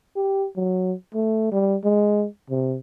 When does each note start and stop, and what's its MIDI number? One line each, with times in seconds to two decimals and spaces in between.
0.16 0.47 67
0.56 0.93 54
1.14 1.50 57
1.52 1.76 55
1.84 2.26 56
2.50 2.77 48